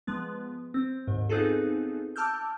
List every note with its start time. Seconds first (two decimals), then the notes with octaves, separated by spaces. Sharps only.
0.07 F3 G#3 B3
0.74 C4
1.07 D#2 G#2
1.29 B3 C4 D#4 F4 G#4 A4
2.16 A5 D6 E6 F6 G6